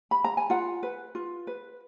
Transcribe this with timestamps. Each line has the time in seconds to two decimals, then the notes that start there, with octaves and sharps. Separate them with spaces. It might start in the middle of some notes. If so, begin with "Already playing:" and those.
0.11 B5
0.24 A#5
0.37 G#5
0.50 F4 F#5
0.83 B4
1.15 F4
1.47 B4